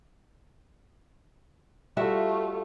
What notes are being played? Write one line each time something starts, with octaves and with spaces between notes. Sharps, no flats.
G3 A3 F4 F#4 E5